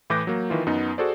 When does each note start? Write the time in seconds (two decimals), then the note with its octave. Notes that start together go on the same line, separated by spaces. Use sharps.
0.10 A2 E3 B4 D6 G6 A#6
0.27 F#3 A#3
0.50 D#3 E3 F4
0.67 F#2 B3 D#4
0.98 F#4 G#4 A4 C5 D5